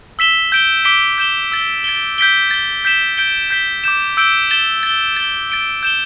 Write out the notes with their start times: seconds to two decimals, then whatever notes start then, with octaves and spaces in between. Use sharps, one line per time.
0.19 E6 B6 E7 G7
0.52 G6 D7 G7
0.85 D6 B6 D7 G7
1.18 G6 E7 G7
1.52 E6 A6 G7
1.84 A6 D7 G7
2.18 G6 B6 D7 G7
2.51 A6 G7
2.85 G6 B6 E7 G7
3.17 G6 D7 G7
3.50 G6 B6 G7
3.84 D6 G6 E7
4.17 E6 G6 D7 G7
4.51 A6 E7 G7
4.83 A6 G7
5.17 A6 G7
5.50 A6 D7 G7
5.83 G6 E7 G7